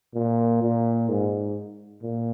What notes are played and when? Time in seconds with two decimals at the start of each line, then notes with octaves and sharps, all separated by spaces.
0.15 A#2
0.62 A#2
1.09 G#2
2.03 A#2